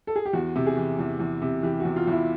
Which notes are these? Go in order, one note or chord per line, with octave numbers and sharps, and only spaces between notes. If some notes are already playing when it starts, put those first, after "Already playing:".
A4
G#4
G4
E2 F#4
C3
G#4
E3
E2
E2
C3
E3 G4
F#4
E2
F4
E2 E4